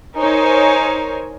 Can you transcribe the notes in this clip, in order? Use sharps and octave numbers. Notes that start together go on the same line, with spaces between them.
D#4 A#4 C5 C#5 G#5